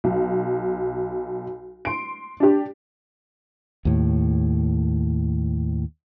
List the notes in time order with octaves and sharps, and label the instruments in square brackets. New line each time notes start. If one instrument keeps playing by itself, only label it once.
[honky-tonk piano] B1
C6 D7
D4 G4
[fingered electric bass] D#2 A2